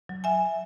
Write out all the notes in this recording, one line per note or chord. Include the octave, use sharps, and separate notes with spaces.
F#3
E5 G#5